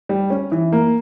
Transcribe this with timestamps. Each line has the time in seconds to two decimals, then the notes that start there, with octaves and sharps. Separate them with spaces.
0.09 G3
0.30 C#4
0.52 E3
0.72 A#3